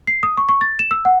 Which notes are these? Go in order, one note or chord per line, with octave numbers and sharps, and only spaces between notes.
C7
D#6
C#6
C#6
A6
E7
E6
F#5